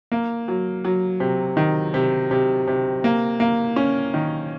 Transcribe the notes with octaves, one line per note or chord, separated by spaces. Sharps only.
A#3
F#3
F#3
C3
D#3
C3
C3
C3
A#3
A#3
C#4
D#3